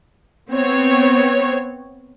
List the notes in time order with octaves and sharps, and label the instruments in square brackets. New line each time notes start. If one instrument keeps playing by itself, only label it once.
[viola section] B3 C4 C#5